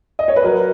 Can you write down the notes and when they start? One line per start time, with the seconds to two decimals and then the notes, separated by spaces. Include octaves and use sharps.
0.19 D#5
0.28 C#5
0.36 B4
0.44 F#3 A#4